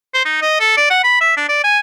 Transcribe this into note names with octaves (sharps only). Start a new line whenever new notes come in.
C5
D#4
D#5
A4
D5
F#5
B5
E5
D4
D5
G#5